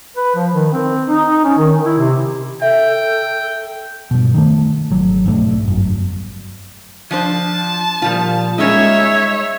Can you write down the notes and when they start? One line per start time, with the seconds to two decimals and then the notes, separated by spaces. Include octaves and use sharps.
0.17 B4
0.35 F3
0.53 D#3
0.73 C4
1.07 D#4
1.44 C#4
1.58 D#3
1.86 E4
1.98 C3
2.62 A4 E5 G5
4.11 G2 B2
4.34 D#3 G#3 A3
4.90 G#1 F#3
5.26 B1 G#2 A3 D4
5.68 G1 F#2
7.11 F3 D4 C5 A5
8.02 A#2 F3 G3 F4
8.58 G3 G#3 C#4 D#4 C#5 E5